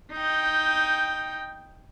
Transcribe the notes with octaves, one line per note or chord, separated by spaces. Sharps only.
D#4 G5